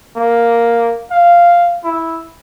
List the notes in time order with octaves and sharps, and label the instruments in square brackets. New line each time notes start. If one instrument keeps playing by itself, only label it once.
[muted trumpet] A#3
F5
E4